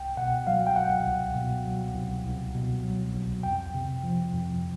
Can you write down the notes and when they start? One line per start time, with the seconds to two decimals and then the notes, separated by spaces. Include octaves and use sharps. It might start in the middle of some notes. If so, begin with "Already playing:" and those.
Already playing: C2 G5
0.17 B2 F#5
0.47 F#3 F5
0.67 G5
0.76 C2 F#5
1.06 C2
1.35 B2
1.65 F#3
1.95 C2
2.25 C2
2.55 B2
2.84 F#3
3.14 C2
3.43 F2 G5
3.74 C3
4.03 F3
4.33 F2